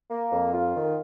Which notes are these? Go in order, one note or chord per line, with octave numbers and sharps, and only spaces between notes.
A#3
F2
F4
D#3